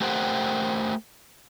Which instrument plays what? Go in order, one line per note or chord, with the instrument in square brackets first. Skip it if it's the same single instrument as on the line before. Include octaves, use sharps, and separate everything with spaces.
[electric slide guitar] A3 G4 A#4 C5 F#5 G5